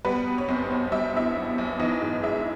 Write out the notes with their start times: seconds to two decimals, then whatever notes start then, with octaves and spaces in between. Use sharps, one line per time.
0.05 G3 B3 B4
0.27 B2
0.38 C#5
0.48 B1 C4 C5
0.70 B1
0.92 G3 E5
1.14 B2 E4 E5
1.36 B1
1.58 B1
1.79 E3 D#4 D#5
2.01 G#2
2.23 G#3 E4 E5